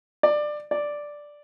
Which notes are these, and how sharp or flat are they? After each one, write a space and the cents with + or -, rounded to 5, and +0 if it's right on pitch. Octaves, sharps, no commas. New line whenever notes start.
D5 +20
D5 +0